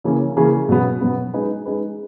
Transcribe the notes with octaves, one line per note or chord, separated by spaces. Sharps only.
C#3 E3 A#3 C#4 G#4
C#3 E3 A#3 C#4 G#4
B2 F#3 B3
B2 F#3 B3
G#3 D#4 G#4 B4
G#3 D#4 G#4 B4